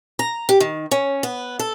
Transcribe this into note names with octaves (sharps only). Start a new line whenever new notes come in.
A#5
G4
D#3
C#4
B3
A4